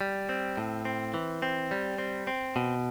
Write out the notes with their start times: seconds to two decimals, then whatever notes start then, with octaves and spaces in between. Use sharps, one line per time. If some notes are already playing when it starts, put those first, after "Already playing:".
0.01 G3
0.29 C4
0.57 A2
0.85 C4
1.14 E3
1.42 C4
1.71 G3
1.98 C4
2.27 C4
2.56 B2